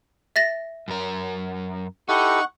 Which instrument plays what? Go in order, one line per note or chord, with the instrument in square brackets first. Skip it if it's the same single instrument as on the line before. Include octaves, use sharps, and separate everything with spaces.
[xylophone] E5 A6 A#6
[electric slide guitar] F#2 A#4
[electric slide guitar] D#4 [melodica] E4 G4 A4 [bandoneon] F#5 C#6